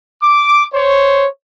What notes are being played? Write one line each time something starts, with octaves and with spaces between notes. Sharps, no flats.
D6
C5 C#5